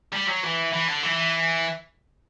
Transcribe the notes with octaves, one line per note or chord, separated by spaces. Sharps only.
G3
F#3
E3
E3
D3
E3